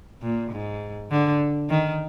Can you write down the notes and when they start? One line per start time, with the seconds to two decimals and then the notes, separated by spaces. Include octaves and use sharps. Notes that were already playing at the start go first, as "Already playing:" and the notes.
0.22 A#2
0.51 G#2
1.11 D3
1.70 D#3